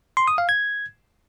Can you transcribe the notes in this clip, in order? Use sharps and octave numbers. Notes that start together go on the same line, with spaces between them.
C6
D#6
F5
G#6